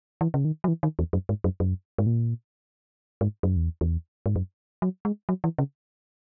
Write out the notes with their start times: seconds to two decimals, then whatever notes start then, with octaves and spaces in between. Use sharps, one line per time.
0.21 E3
0.34 C#3
0.45 D#3
0.64 F#3
0.68 E3
0.83 D#3
0.99 E2
1.13 F#2
1.29 G#2
1.44 F#2
1.60 F#2
1.98 G#2
2.06 A#2
3.21 G#2
3.43 F#2
3.57 E2
3.81 E2
4.26 G#2
4.36 F#2
4.82 F#3
5.05 G#3
5.29 F#3
5.44 E3
5.58 C#3